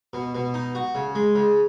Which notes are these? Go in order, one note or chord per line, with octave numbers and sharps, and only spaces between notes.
B2
B2
D#4
F#4
C#3
G#3
C#3